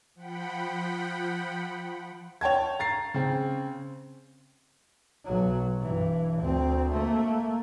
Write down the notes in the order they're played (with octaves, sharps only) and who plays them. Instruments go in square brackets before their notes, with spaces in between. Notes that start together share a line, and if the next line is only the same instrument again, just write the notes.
[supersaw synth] F3 F#5 G5 B5
[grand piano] C#5 G5 A5 G#6
A#5 A6 C7
C#3 C4
[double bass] B1 F#3
G2 E3
D2 C4
A3 A#3